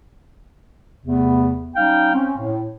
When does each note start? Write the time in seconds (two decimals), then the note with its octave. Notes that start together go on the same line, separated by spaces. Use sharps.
1.05 E2 C3 A3 B3
1.75 G3 C#4 D#4 F5 G5
2.14 C4 C#4
2.37 A2